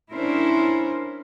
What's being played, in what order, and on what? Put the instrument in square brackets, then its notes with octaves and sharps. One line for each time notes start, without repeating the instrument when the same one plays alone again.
[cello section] C#4 D4 E4 A#4 C5